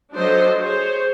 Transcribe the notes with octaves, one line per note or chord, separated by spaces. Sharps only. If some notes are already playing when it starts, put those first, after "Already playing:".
F#3 D4 F4 A4 C5 D#5
G#4 C5 C#5